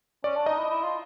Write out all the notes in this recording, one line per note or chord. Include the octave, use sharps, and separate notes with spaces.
C#4 D5
D4
D#4 D#5
E4
E4
F4